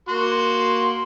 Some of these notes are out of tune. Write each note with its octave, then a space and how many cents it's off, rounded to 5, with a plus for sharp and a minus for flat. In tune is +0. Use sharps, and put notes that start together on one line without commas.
A#3 +0 F#4 +0 C6 +0